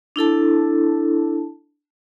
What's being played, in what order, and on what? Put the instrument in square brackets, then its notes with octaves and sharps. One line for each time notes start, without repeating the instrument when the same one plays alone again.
[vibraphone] D4 E4 A4 A5